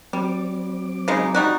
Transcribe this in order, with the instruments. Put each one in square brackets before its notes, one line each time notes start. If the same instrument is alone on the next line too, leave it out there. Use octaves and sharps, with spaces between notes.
[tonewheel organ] F#3 C4 D6 [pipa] G3
[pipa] C#3 G#3 D#4
G3 D#4 F#4